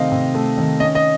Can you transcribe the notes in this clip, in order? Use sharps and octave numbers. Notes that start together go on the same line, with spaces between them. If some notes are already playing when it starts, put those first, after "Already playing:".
Already playing: C3 D#3 A3 C4 D#5 F5
C3
A3
D#3
C#4 D#5
D#5